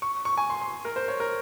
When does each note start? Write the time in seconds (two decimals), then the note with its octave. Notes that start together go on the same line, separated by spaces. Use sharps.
0.02 C#6
0.25 C#6
0.37 G#5
0.50 C6
0.61 C6
0.85 A#4
0.96 C5
1.08 C#5
1.20 A#4